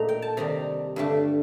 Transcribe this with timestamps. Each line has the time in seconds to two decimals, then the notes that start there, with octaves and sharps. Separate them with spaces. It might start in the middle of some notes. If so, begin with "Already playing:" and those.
Already playing: A#2 A3 D#4 A#5
0.09 G5
0.22 A5
0.37 C3 D#3 G3 A#5
0.96 G2 D3 A3 D4